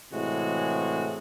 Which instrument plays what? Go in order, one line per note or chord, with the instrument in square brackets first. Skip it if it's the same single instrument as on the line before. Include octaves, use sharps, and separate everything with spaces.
[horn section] A2 C3 E3 G#3 F#4